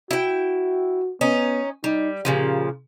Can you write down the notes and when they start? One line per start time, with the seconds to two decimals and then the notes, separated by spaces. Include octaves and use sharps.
0.11 E4 F#4 G5
1.21 B3 C#4 D#4
1.84 G3 D#4
2.25 A#2 C#3 F3 G4